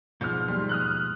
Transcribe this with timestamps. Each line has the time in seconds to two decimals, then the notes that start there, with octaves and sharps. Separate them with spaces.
0.21 G#2 B2 F3 F6 G6
0.48 D#2 G3 C6
0.69 D#6 F6 F#6